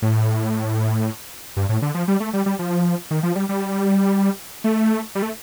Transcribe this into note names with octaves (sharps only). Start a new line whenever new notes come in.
A2
G2
A2
D3
F3
G3
A3
G3
G3
F3
D#3
F3
G3
G3
A3
G3
A3